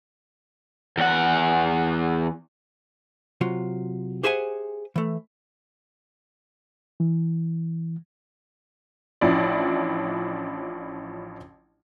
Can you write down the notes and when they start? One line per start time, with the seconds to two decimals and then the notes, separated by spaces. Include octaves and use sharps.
0.98 E2 F#5
3.41 C3 F#3 F4
4.23 G4 G#4 C5 E5 F#5 G#5
4.96 E3 A3
7.00 E3
9.21 A1 F3 C#4 D4 E4 D5